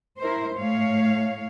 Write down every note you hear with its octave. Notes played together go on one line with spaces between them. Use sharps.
E4 A#4 C5
A2 A3 C#5 F5